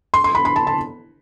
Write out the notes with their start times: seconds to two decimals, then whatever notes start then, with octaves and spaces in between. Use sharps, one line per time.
0.14 C6
0.24 C6
0.35 B5
0.45 B5
0.56 A5
0.67 A5